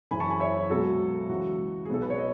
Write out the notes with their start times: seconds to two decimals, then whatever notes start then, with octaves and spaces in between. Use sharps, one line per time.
0.11 F#1 F#2 E3 G#5 B5
0.20 A5 C#6
0.30 G#5 B5
0.40 C#5 E5
0.70 C#2 B2 F#3 F#4 A4
1.29 C#2 C#3 E3 F#4
1.85 G#4
1.89 B1 B2 G#3 B3 A4
2.02 B4
2.10 C#5
2.18 D#5